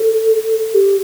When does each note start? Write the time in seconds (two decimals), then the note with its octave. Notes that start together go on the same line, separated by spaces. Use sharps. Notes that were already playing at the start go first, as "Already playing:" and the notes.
Already playing: A4
0.74 G4